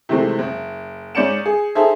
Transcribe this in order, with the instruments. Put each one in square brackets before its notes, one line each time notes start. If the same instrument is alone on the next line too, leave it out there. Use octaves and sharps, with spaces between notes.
[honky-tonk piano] C3 D#3 E3 G#3 A3 C4
F#1
G#2 C#4 D5 G6 C#7 E7
G#4
D#4 G#4 A4 C5 E5